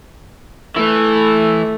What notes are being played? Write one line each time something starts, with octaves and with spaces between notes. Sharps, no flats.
E3 A3